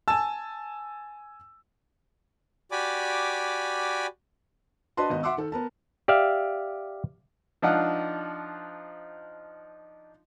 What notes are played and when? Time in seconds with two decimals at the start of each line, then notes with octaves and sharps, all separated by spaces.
0.08 G#5 A5 E6
2.71 F#4 G4 D5 G#5 B5 D6
4.97 D4 F#4 B4 D#5 A5 C6
5.10 G#1 B3 F#4 D#5
5.23 E5 F#5 C6 D6 E6
5.37 D#3 A4
5.52 B3 A#4 A5
6.08 G4 D5 E5 F5
7.62 F3 D4 D#4 F4 F#5